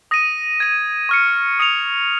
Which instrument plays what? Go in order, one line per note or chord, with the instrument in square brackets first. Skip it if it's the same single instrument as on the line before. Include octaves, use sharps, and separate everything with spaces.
[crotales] D#6 A#6 D#7
G#6 D#7
C#6 F6 C#7
D#6 C#7 F7